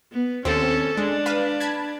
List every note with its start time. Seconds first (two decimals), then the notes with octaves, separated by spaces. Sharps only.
0.12 B3
0.45 D#2 C4 C#4 A4
0.97 G#3 D4
1.26 B4 F5 B5
1.60 A5 B5 G#6